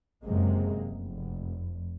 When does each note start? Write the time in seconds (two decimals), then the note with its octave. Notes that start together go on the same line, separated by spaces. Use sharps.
0.24 F#1 F#2 C3 G#3 A#3
0.88 F1